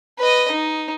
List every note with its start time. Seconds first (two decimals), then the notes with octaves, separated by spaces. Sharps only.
0.18 B4 D#5
0.51 D#4